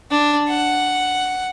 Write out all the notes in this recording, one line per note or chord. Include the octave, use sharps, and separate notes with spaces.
D4
F#5